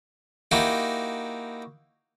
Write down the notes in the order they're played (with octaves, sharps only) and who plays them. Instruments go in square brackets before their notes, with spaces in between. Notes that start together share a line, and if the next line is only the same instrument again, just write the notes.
[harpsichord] A#3 D#4 E4 F#4 G4